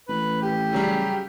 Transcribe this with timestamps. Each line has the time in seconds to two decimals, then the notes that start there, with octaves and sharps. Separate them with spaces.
0.08 A1 B4
0.42 G4
0.73 C#3 F#3 G3